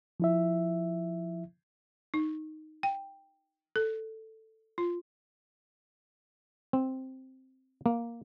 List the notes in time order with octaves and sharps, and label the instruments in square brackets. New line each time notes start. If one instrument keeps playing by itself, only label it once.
[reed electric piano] F3 E4 E5
[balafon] D#4
G5
A4
F4
[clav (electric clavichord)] C4
A#3